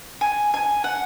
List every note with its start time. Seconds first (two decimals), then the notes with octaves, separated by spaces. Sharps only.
0.21 G#5
0.54 G#5
0.84 F#5